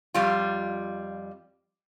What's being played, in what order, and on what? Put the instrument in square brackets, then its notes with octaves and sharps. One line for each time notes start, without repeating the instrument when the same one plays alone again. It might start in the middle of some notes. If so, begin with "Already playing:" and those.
[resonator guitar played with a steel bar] F2 G3 F4